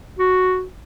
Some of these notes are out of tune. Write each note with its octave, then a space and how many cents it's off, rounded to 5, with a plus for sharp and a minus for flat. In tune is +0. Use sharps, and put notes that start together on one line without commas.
F#4 +0